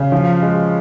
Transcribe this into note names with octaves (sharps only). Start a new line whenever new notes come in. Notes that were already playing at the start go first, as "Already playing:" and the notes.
Already playing: C#3
F3
G#3